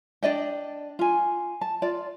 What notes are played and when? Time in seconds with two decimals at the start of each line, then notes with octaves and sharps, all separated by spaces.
0.23 D4 D5 D#5 G5
0.99 F4 G#5
1.61 A5
1.82 F4 D5